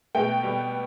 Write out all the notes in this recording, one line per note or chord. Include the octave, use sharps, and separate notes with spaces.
B2 A3 G5
B2 G3